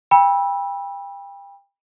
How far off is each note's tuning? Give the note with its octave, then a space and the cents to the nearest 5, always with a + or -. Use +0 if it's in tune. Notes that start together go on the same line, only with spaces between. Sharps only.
G5 +30 B5 -25 E6 -5